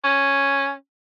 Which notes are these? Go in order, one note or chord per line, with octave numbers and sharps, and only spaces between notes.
C#4